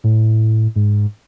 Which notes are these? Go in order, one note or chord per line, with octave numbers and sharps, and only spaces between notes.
A2
G#2